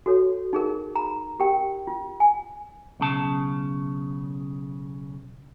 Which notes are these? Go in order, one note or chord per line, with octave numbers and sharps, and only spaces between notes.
F#4 A4 C#5
D#4 G#4 A#4
A#5 B5
G4 A#4 G5
F4
G#5
B1 C#3 A5